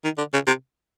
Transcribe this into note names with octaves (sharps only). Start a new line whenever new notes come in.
D#3
D3
C#3
C3